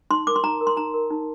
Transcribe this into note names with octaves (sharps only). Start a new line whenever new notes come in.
D#4 C6
A#4 D6
C6
D#4 A#5
A#4
C6
D#4 A#5
A#4
D#4